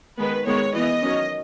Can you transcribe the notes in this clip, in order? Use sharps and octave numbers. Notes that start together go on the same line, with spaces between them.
D#3 G#3 B3 B4
D#3 G#3 B3 C#5
E3 B3 D#5
D#3 F#3 C#4